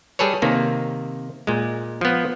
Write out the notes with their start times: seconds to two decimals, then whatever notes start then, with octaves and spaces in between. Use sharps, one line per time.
0.19 G3 G#4 A4 B4 C#5
0.42 C3 D#3 A#3
1.47 A#2 G#3
2.01 F3 B3